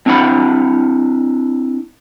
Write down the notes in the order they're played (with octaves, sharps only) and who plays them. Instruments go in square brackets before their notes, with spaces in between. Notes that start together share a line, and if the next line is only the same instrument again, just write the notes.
[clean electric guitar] C4 D4 E4 F#5 B5